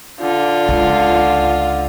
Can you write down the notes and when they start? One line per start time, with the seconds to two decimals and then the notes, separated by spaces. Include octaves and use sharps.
0.20 D3 F4
0.68 C#2